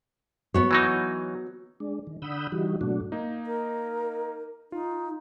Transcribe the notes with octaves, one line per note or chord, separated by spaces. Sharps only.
B3 F#4 C#5
E3 F#3 D#4
G#3 D4
D#3
D3 F#5 B5 D#6 E6 G6
E3 G3 D#4 F#4
G#2 B2 F#3 A3 D4 F#4
A#3 D#4
A#4
D#4 F4